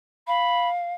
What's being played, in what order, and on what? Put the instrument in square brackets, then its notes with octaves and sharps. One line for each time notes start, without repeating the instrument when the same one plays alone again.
[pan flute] F5 [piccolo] B5